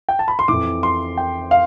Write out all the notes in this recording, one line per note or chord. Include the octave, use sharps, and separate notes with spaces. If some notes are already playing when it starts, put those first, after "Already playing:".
G5
A5
B5
C6
F2 E3 D6
C6
G5
F5